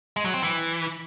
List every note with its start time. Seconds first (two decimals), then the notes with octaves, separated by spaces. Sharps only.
0.16 G#3
0.25 F#3
0.34 C4
0.42 E3